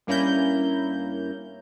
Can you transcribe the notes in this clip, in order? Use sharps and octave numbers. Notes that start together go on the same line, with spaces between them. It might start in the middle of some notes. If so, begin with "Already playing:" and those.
G2 A#3 C#4 E4 A#5 G6